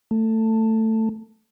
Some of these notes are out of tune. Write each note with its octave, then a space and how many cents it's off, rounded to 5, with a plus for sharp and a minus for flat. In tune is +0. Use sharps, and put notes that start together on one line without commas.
A3 +15